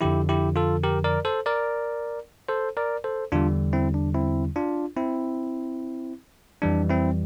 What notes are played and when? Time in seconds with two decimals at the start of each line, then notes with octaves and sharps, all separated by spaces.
0.01 F2 D3 F3 E4 G4
0.29 E4 G4
0.56 F4 A4
0.83 G4 A#4
1.04 A#4 D5
1.25 A4 C5
1.46 A#4 D5
2.48 A4 C5
2.77 A#4 D5
3.04 A4 C5
3.32 E2 D3 G3 D4 F4
3.73 C4 E4
3.94 D4
4.14 C4 E4
4.56 D4 F4
4.97 C4 E4
6.62 F2 E3 G3 D4
6.89 C4 E4